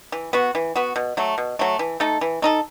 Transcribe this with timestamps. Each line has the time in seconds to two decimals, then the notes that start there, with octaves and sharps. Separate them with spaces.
0.12 E3
0.33 B3 F#4
0.55 E3
0.76 B3 F#4
0.96 B2
1.17 F#3 A3
1.38 B2
1.59 F#3 A3
1.79 E3
2.00 A3 D#4 A4
2.21 E3
2.42 A3 D#4 A4